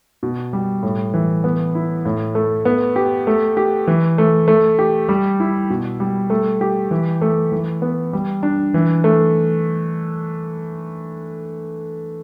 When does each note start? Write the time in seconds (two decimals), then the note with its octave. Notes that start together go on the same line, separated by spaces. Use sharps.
0.23 B2
0.53 G3
0.83 A2
1.14 E3
1.44 B3
1.75 E4
2.05 A2
2.35 A3
2.65 B3
2.96 G4
3.27 A3
3.57 G4
3.87 E3
4.18 A3
4.48 A3
4.79 G4
5.09 G3
5.40 E4
5.70 B2
6.00 G3
6.30 A3
6.61 G4
6.91 E3
7.22 A3
7.52 E3
7.82 B3
8.13 G3
8.43 D4
8.74 E3
9.04 A3